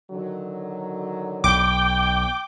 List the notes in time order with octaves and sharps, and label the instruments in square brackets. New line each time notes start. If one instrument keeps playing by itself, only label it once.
[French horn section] D3 D#3 F#3
[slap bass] B1 [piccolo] G5 [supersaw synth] D6